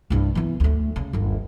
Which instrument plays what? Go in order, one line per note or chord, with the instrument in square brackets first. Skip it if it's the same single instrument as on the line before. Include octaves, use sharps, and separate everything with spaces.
[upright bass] C2 G2
E3 B3
D2 A3
C#3
G1 D#2